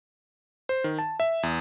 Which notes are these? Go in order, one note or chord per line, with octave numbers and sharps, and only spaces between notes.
C5
D#3
A5
E5
E2